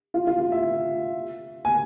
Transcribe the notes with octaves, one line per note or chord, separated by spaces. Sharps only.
F4
F4
F4
E5
G#5